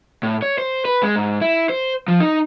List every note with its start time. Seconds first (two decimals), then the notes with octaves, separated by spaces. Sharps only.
0.23 A2
0.42 C#5
0.58 C5
0.85 B4
1.03 G#3
1.16 G#2
1.41 E4
1.69 C5
2.08 F3
2.20 D#4